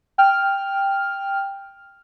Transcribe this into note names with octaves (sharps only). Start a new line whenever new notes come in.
G5 F6